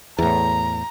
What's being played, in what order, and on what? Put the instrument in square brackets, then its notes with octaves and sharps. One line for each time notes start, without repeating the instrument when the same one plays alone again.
[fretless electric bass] E2 A2 [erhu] A#5